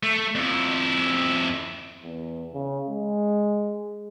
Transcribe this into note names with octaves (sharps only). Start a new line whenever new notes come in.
A3
F2 E4
E2
C#3
G#3